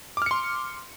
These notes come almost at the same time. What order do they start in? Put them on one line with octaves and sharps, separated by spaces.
D6 F6 C#7 C6